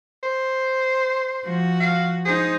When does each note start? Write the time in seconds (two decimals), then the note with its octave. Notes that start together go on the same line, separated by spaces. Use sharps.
0.23 C5
1.45 F3 F#4
1.80 F5
2.25 D#4 G#4 C5